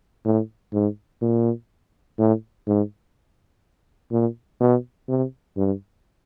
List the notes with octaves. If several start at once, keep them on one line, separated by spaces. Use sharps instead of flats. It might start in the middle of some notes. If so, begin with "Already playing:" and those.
A2
G#2
A#2
A2
G#2
A#2
B2
C3
G2